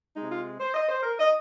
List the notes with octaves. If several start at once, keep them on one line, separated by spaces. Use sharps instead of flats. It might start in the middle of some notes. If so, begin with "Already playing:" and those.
C3 G#3 D#4
F4
C5
D#5
C5
A#4
D#5